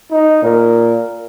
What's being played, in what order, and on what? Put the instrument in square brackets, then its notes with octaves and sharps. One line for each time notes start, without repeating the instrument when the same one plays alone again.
[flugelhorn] D#4
[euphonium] A#2 [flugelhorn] A#4